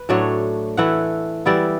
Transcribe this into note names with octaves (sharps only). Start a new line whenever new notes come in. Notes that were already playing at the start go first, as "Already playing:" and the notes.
Already playing: B4
A2 F#3 A3 D4 C#5
E3 A3 E4 F#5
E3 G3 B3 E4 D5